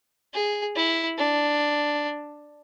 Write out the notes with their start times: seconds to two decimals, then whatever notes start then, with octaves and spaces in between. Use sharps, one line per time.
0.34 G#4
0.76 E4
1.17 D4